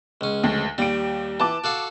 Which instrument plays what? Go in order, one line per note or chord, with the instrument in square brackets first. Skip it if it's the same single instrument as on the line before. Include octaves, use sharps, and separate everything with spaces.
[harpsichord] C#2 C#4
[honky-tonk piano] D2
[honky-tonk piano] D#2 D7 [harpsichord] G3
[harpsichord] E3 [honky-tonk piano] A5 D6
[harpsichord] F#4 A4 F5